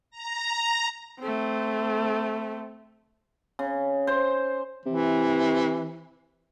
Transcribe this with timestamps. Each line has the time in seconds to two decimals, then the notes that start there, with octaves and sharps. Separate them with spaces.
0.11 A#5
1.20 A3 C4
3.59 C#3
4.07 C5
4.86 C3 E3